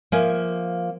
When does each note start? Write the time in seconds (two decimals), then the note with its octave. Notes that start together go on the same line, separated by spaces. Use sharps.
0.12 F3 A#3 E5 G#5